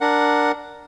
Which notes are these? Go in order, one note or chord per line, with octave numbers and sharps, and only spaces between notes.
D4 A#4 F#5